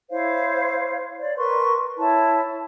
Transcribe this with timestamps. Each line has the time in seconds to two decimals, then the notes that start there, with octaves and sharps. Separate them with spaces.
0.10 E4 C5 C#5 F5
1.20 C#5 D5
1.38 A#4 B4 C6 C#6
1.97 E4 C#5 A5